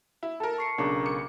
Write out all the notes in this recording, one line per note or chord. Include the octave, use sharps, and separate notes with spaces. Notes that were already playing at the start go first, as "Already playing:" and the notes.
E4
A4 A#4 A5
C#6 C7 C#7
B1 C#3 D4 A#4 A#5 C#6 D6
D6 C#7